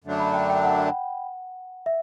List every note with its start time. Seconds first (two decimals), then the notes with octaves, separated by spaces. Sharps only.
0.04 F#2 D3 F#3 A3 D4
0.20 B5
0.34 G5
0.50 G5
0.65 F#5
1.86 E5